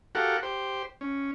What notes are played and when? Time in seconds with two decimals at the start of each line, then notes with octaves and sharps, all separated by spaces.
0.15 F#4 G4 A4 A#4 F5 F#5
0.43 G4 C5
1.01 C#4